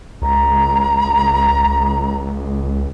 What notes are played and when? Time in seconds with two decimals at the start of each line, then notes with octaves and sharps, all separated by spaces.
0.22 C#2 A#5